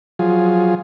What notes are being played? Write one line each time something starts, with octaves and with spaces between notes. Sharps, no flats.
F3 F#3 F4 G#4